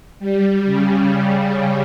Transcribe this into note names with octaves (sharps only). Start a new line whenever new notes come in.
G3
C#3